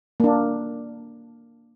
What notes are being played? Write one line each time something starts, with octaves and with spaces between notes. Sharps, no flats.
A#3 D4